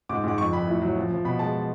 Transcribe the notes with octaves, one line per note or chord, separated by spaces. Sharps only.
G#2 D6
G#2 D6
F2 C#6
F2 B5
A2
F#3
F3
F3
B2 B5
G#3 A5